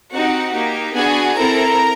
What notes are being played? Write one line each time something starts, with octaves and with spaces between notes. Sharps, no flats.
C4 D#4 F#4 G4 F#5
A#3 D#4 G4
B3 D4 F#4 G#4 G#5
C4 E4 A4 A#4 A#5